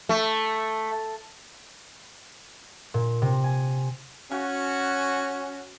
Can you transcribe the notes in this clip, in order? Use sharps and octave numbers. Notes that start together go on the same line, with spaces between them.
A3
A#2
C3
G#5
C#4 F#4